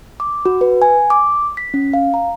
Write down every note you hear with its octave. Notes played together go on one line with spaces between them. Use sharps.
D6
F#4
B4
G#5
D6
B6
C#4
F5
A#5